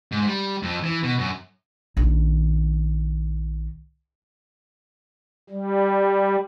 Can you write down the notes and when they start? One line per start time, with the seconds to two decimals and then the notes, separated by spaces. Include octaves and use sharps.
0.12 G#2
0.26 G3
0.63 F2
0.84 E3
1.03 B2
1.19 F#2
1.97 A#1 D#3
5.50 G3